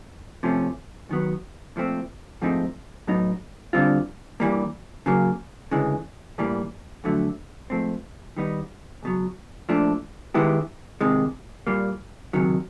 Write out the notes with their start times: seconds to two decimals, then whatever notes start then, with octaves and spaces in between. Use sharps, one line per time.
0.43 C3 F3 A3 C#4
1.09 F#2 D#3 F#3 B3
1.76 A#2 F3 A3 C4
2.42 G#2 F3 A3 C4 D#4
3.07 A2 F#3 B3 D#4
3.73 G2 D3 G3 C4 F4
4.40 G2 E3 G3 A#3
5.06 C#3 F#3 A#3
5.71 D2 C#3 E3 G#3
6.38 A2 E3 G3 A#3
7.04 F2 D3 F#3 A3
7.70 G#2 F3 A3 C4
8.37 D#3 G3 B3 D#4
9.03 C#2 B2 F#3
9.69 A#2 F3 A3 D4
10.34 D#3 G#3 B3 E4 G4
11.01 C3 D#3 G#3
11.67 A#2 G3 A#3
12.33 C#2 C3 D#3 F#3